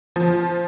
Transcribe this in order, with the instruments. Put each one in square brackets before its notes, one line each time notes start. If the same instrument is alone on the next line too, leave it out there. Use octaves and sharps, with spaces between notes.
[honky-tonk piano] F3